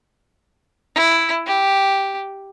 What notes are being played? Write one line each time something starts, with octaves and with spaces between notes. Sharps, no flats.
E4
G4